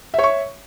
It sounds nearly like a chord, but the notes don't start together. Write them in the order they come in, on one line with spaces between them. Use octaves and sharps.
E5 C#5 C#6